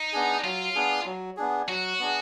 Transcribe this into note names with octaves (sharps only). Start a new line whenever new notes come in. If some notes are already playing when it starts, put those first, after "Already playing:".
Already playing: D#4
B3 D4 G#4
F#3 F4
B3 D4 G#4
F#3
B3 D4 G#4
F#3 F#4
B3 D4 G#4